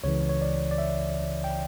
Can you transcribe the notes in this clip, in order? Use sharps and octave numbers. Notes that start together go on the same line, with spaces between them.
C#2 C#3 E3 C#5
C#5
D5
D5
E5
G5